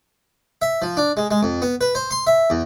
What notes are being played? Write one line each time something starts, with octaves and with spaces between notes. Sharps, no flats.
E5
F3
D4
G#3
G#3
F2
B3
B4
C5
C6
E5
E2